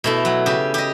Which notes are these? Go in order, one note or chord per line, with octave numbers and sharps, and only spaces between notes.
B2 A3 E4
F#3
C#3 G4
G4 D#5